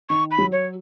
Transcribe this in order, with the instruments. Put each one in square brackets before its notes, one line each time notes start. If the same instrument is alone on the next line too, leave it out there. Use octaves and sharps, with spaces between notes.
[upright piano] D#3 [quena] C#6
[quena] B5
[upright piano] F#3
[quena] C#5